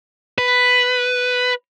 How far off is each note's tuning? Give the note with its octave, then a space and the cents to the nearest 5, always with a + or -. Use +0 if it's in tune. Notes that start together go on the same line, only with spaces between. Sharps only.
B4 +5